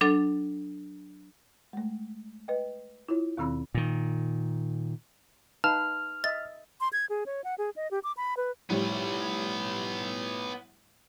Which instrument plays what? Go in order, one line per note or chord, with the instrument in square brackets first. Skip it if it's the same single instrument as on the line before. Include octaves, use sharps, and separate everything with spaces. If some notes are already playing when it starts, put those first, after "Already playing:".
[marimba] F#3 D4 A4 A6
G#3 A3
B4 D#5 G5
E4 F4 C#5
D#2 B2 D#3 C4 B5 E6
[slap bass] A#2 D#3
[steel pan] D#4 B4 F5 [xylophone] A5 [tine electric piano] F6
[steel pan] D#5 E5 [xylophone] A6
[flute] C6
G#6
G#4
C#5
F#5
G#4
D#5
G4
D6
B5
B4
[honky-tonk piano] A2 F3 G3 [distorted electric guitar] B3 C#5